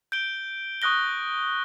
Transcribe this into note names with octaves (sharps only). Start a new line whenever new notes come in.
G6 D7 G7
C#6 D#6 F#6 A#6 G7